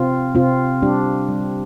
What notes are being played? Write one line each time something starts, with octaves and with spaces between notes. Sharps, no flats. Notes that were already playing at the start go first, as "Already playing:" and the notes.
Already playing: C3 C4 F4
C3 C4 F4
G3 D4 G4
G3